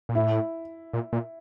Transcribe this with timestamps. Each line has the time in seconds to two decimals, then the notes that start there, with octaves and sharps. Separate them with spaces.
0.09 A#2
0.15 A2 E4
0.93 A#2
1.13 A#2